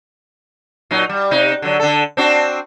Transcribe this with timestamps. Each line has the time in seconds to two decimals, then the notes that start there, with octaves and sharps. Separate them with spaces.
0.91 A#2 F#3 D#4
1.09 G3
1.31 C3 D#4
1.62 D3 F#3
1.80 D3 A4
2.17 C4 D4 F#4